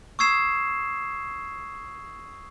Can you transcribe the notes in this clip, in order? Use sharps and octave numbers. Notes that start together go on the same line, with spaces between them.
C#6 D#6 E6 G#6 C7 E7